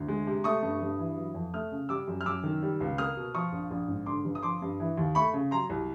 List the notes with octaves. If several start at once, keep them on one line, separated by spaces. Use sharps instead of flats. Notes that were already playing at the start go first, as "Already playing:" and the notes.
Already playing: D2
G#3
C3
A3 C#6 D#6
G2
G2
E3
F#3
F2
A3 D#6 F6
C#3
G3 D6 E6
F#2
F6
F#2 D6 E6
D#3
G3
C#2
A#3 D#6 F6
B2
F3 C#6 D#6
A#1
A#1
G#2
D3 C6 D6
G1
D#6
F3 C6 D6
G2
E3
D#2
A3 B5 C#6
C#3
F#3 A#5 C6
C2